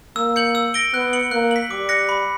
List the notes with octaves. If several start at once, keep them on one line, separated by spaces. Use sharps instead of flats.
A#3 E6
G6 C#7 F#7
E6
A#6 D7 G7
B3 F#6
C#7 F#7
A#3 F#6
B6 F#7
G3 D6
F#6 A#6 C#7
B5